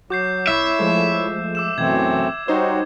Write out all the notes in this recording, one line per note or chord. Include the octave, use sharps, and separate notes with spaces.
F#3 F#4 D6 G6 C7
C2 E4 C#5 E5
F3 G#3 A3
D6 E6 E7
F#2 B2 E3 A3 C4 G#6
G3 D#4 F#4 C5 C#5